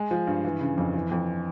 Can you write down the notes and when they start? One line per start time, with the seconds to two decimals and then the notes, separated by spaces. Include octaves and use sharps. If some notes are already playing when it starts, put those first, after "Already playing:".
Already playing: G#3
0.11 F3
0.27 G2
0.45 E3
0.61 C#3
0.78 F2
0.94 E3
1.11 F2